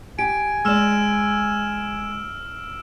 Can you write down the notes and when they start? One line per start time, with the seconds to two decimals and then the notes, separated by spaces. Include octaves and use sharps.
0.19 G4 G#5 D7
0.65 G#3 D5 E6 F6 E7